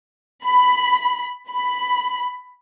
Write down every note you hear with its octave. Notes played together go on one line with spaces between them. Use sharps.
B5
B5